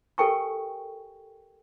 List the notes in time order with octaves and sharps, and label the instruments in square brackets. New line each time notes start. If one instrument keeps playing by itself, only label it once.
[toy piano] G4 A4 A#4 G5 G#5 C#6